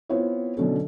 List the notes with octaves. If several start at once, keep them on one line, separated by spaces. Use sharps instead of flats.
B3 C4 E4 F4 C5 C#5
B2 D3 F#3 C#4 A4